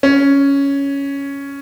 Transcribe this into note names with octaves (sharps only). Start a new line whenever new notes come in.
C#4